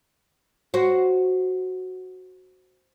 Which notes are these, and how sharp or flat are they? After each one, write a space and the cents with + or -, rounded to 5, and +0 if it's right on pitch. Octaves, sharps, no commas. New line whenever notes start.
F#4 +0 C5 +0